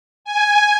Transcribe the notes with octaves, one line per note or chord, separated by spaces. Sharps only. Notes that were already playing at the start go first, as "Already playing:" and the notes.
G#5